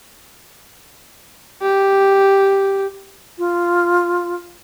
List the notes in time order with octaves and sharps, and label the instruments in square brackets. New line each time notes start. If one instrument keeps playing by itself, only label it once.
[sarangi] G4
[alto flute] F4